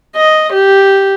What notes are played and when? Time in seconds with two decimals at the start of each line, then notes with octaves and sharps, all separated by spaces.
0.16 D#5
0.53 G4